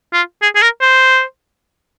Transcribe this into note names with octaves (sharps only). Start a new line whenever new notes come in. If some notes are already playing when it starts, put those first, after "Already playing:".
F4
G#4
G#4
A#4
C5